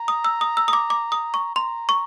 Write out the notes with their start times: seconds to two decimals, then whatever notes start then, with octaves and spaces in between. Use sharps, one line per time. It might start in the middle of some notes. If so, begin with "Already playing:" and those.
Already playing: A#5
0.08 D#6
0.25 E6
0.41 D#6
0.57 E6
0.68 D#6
0.73 D6
0.90 D6
1.12 D#6
1.34 C#6
1.56 A#5 C6
1.89 C#6